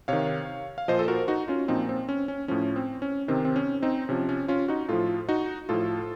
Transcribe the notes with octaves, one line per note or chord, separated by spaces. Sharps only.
C3 D#3 C#5 F5
F5
A#2 F3 C5 D#5
A4
F#4 A#4
D#4 F#4
C#4 F4
A#2 F3 C4 D#4
C4
C#4
C#4
A2 F3 C#4
C4
C#4
C3 D#3 C4
C4
C#4
C4 D#4
C3 F3 C#4
C#4
C#4 F4
D#4 F#4
A2 F3 F4 A4
D#4 F#4
A2 F3 F4 A4